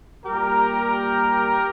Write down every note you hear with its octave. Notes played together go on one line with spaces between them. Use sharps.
A#2 G3 A#3 G4 A#4